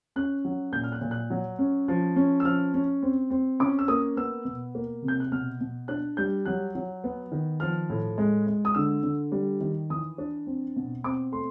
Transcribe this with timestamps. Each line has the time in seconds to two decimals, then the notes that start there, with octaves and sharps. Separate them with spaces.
0.16 C#4 F#6
0.45 F#3
0.73 A#2 G6
0.84 F6
0.92 F#6
1.01 A#2
1.11 F#6
1.30 F#3
1.58 C#4
1.88 F3
2.16 C#4
2.40 E6
2.44 F3 F6
2.74 C#4
3.02 C4
3.30 C4
3.59 C#4 D6
3.79 E6
3.88 A#3 D#6
4.17 B3 E6
4.45 B2
4.75 A#3
5.02 C3
5.08 G6
5.20 F#6
5.32 B2 F6
5.61 B2
5.88 D4 F#6
6.17 G3 G6
6.45 F#3 F#6
6.75 F#3
7.04 B3
7.32 D#3
7.60 F3 F6
7.90 A2
8.18 G#3
8.47 G#3
8.65 D#6
8.75 D3 E6
9.03 D3
9.32 G3
9.60 D#3
9.90 E3 D#6
10.18 D4
10.46 C4
10.76 B2
11.04 C4 D6
11.32 A3 C6